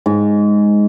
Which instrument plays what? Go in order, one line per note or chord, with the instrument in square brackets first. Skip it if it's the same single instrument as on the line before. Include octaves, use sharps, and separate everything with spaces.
[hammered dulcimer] G#2